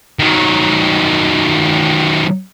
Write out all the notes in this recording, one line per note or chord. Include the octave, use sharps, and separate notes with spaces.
D#3 F#3